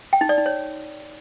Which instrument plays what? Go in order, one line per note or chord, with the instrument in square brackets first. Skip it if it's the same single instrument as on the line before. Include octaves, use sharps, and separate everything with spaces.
[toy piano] G5
D#4
D5
D#4
C#5